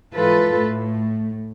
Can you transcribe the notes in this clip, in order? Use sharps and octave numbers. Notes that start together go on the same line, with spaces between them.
G#2 E3 F4 A4 B4
A2 A3